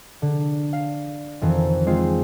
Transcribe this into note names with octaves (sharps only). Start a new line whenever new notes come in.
D3
F5
F2 D#3 E3
G#3 C4 F4